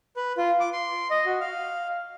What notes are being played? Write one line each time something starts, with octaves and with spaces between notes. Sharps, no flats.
B4
F4
D6
C6
D#5
F#4
F5